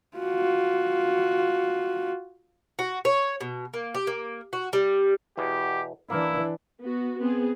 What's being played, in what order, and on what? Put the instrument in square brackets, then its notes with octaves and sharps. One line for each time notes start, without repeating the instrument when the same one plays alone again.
[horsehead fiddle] F4 F#4
[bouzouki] F#4
C#5
B2
A#3
G4
A#3
F#4
G3
[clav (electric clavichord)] E2 B2 [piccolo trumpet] G4
[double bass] E3 D4 [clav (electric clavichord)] A#3 [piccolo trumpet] E4
[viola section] B3 F#4
B3 C4 G#4